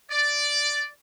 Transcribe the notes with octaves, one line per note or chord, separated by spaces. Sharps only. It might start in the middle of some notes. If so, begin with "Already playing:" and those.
D5